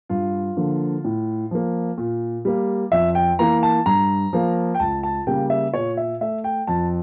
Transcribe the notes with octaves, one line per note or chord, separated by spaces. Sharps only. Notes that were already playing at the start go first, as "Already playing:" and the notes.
G2 F4
D3 F3 A#3
A2
F3 A#3
A#2
G3 A#3
F2 E5
G5
E3 A#3 A#5
A5
G2 A#5
F3 A#3
G5
C#2 A5
A5
C#3 G3 A#3 G5
E5
A#2 C#5
E5
A3 E5
G5
F2 A5